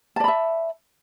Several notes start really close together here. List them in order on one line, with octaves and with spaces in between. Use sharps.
A5 D5 B5 E5